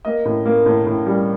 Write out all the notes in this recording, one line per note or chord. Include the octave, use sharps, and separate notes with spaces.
A#3 D#5
A2
A#3
A2
A2
G3